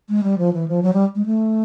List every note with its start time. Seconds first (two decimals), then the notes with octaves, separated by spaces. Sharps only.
0.09 G#3
0.24 G3
0.38 F3
0.53 E3
0.68 F3
0.83 F#3
0.93 G3
1.15 G#3
1.26 A3